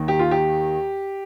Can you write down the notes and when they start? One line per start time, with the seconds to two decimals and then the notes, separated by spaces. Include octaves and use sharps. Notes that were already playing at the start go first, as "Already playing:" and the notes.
Already playing: D#2 D#3
0.08 G4
0.19 F4
0.31 G4